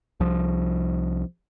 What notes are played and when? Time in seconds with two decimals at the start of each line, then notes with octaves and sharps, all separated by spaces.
0.20 C2 F3